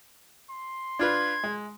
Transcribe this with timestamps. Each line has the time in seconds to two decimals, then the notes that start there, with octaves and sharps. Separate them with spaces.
0.50 C6
0.99 D4 F4 B4 G#6
1.44 G#3